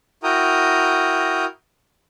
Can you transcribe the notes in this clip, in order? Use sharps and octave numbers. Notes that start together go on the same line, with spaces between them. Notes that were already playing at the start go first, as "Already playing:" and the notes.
E4 F#4 A#4 G5 A#5 D#6